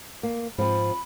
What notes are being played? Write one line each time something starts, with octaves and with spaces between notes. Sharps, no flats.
A#3
G#2 F3 C4 B5